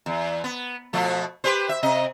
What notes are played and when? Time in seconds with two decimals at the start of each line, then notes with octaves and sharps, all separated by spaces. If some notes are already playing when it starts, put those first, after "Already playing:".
0.06 E2
0.44 B3
0.93 B2 F3 A3
1.44 G4 B4 C5
1.69 E5
1.83 C3 D#5